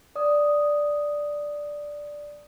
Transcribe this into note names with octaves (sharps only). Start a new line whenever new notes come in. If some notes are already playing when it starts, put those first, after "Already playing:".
D5 D#6